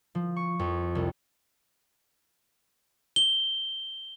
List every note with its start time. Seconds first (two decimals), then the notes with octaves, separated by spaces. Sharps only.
0.15 F3
0.36 C#6
0.59 F2
0.95 C2
3.16 G7